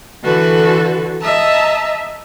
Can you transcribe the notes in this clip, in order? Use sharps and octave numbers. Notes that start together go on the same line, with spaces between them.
D3 E3 F#4 A4 B4
D#5 E5 A5 A#5